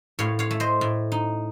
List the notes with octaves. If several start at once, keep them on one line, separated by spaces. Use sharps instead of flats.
A2 C#5 F5
C#5 F5
A3
C5 D#5
A2
D#4